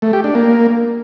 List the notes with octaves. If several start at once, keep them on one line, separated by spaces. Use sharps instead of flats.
A3
G4
D4
A#3